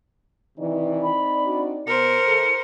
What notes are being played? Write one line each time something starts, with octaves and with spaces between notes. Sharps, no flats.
C3 D#3 E3 C4 D#4 D5
B5
D4 F#4
B2 A#4 C5 C#7
E3 A4